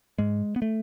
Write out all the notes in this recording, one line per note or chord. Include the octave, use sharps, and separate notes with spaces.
G#2 G#3
B3
A3